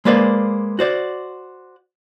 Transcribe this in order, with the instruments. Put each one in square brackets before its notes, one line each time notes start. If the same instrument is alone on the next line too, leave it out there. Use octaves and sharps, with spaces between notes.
[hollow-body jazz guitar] G#3 A#3 B4 C5 D5
F#4 C5 D5